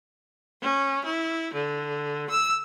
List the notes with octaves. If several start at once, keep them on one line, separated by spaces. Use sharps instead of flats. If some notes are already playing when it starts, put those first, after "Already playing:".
C#4
E4
D3
E6